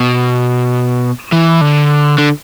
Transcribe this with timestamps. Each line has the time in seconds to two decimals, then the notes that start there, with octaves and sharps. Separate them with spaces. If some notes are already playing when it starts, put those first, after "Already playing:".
Already playing: B2
1.32 E3
1.61 D3
2.18 D3